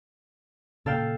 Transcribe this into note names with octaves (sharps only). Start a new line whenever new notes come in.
A#2 C#3 A4 F5 G5